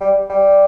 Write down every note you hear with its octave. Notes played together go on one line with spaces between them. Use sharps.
G3
G3